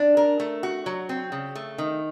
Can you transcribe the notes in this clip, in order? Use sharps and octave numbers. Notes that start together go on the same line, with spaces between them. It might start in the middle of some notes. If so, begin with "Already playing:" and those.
Already playing: D4
A#4
A3
F#4
F#3
C4
C#3
A3
D#3